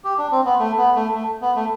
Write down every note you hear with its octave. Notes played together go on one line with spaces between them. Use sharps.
G4
D4
C4
B3
A3
B3
A3
A3
B3
A3